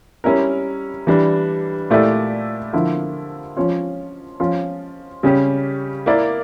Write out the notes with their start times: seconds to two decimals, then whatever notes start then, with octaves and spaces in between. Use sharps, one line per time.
0.24 G3 C#4 E4 A#4
1.07 E3 G3 D4
1.90 A#2 A3 E4 G4 D5
2.73 D3 F3 A#3 E4
3.57 F3 C#4 F4 C#5
4.40 F3 C#4 F4
5.23 C#3 G3 C#4 G4
6.06 A#3 E4 A#4 D5